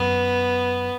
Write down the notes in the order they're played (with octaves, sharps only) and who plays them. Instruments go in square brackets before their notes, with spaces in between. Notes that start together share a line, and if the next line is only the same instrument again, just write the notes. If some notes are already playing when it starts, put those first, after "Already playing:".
Already playing: [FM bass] F#2 [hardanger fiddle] B3